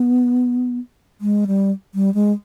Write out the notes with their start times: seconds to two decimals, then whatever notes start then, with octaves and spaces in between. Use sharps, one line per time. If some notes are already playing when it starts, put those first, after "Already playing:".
Already playing: B3
1.21 G#3
1.47 G3
1.95 G3
2.14 G#3